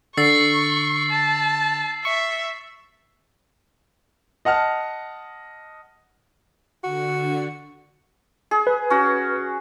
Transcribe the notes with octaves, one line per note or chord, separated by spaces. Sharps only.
D3 C#6 E6 A6 C7
A5
E5 C#6
D#5 F#5 A5 F6
D3 F#4
G#4
B4
C#4 F#4